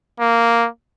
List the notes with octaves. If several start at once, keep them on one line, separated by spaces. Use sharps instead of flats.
A#3